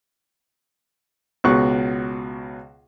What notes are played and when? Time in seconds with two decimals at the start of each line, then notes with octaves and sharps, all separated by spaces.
1.44 C#2 B2 C#6 F#6